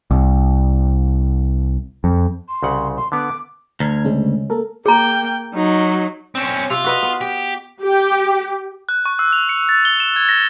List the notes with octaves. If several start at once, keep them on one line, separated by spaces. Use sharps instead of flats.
C2
F2
C6
C2 C#3 F#5
C6
D3 B3 D6
D2 A#5 F6 G#6
C#3 G#3 C#4
A#3 A4 A#4
A#3 G#4 G5 A#5
F#3 D#4
C4 C#4
C3 F4
F#4 B4 D#5
B3
G4
G4
F#6
C#6
E6
F7
C#7
A6
G7
E7
G#6
A#6